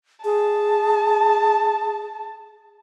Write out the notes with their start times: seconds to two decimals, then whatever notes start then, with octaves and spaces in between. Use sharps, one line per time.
0.25 G#4 A5